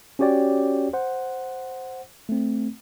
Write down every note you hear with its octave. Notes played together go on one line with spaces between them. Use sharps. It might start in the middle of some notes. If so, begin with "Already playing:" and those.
C#4 F#4 G4 C#5 D5 G5
C5 F#5
A3 C4